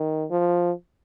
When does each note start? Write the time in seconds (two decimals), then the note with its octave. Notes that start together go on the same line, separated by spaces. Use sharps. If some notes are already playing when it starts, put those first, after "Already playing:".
Already playing: D#3
0.31 F3